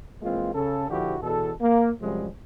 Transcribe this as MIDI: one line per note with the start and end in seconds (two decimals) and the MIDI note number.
0.22 0.50 52
0.22 0.50 56
0.22 0.50 58
0.22 0.50 60
0.22 0.50 65
0.53 0.86 49
0.53 0.86 61
0.53 0.86 69
0.89 1.15 34
0.89 1.15 50
0.89 1.15 53
0.89 1.15 64
0.89 1.15 66
0.89 1.15 67
1.22 1.51 40
1.22 1.51 47
1.22 1.51 69
1.61 1.90 58
2.01 2.27 42
2.01 2.27 48
2.01 2.27 53
2.01 2.27 55
2.01 2.27 56